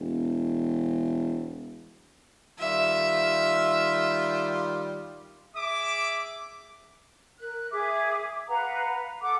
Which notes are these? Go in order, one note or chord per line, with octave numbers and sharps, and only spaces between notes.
E1
D#3 G3 F4 E5
G#4 E5 D6
A#4 F#6
G#4 E5 D6
B4 F5 F#5 A#5
A4 F#5 D6